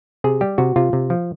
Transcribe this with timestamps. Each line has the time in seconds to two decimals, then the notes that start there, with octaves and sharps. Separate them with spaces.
0.24 C3 G#4
0.41 G3 G4
0.58 C3 F#4
0.76 C3 F4
0.93 C3
1.10 F3